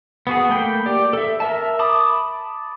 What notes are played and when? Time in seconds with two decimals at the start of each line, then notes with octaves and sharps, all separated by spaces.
0.27 B3 F#4 G#4
0.49 A3 A#3 G5 B5
0.86 G4 D5
1.13 A4 E5
1.40 A#4 E5 A5
1.79 A5 B5 D6 D#6